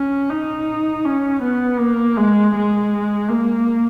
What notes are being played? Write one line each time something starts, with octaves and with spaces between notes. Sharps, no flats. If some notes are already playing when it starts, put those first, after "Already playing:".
Already playing: C#4
D#4
C#4
B3
A#3
G#3
G#3
A#3